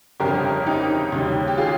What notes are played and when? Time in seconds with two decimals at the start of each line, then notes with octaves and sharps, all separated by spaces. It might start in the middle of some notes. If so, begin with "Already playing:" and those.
0.20 G1 F2 C#3 G3 G4 A#4
0.66 D#4 G4
1.12 D#2 C#3 G3
1.48 G4
1.58 F4 G#4